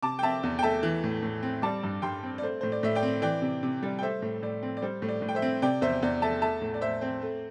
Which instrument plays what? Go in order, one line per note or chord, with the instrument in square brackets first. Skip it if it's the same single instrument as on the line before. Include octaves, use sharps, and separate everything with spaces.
[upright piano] C3 A5 D6
G5
C4 E5 A5
E2
G5
A3 E5 A5
E3
A2
A2
C4
G3 A5 D6
G2
G2 G5 C6
C4
D5
A3 C5
A2 C5
D5
A2 E5
D5 G5
C4
E3 D5 G5
C3
C3
G3
G5
A3 C5 E5
A2
A2 D5
C4
D5
G3 C5
A2
D5
A2
G5
C5 E5
C4
C3 D5 G5
E2 C5 E5
E2 D5
A3 E5 A5
A3 E5 A5
A2
D5
A2 C5 E5
C4 C5
A3